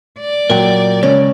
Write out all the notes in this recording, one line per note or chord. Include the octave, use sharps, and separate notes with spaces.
D5
A#2 F#3 A#4 G5
C#2 C#4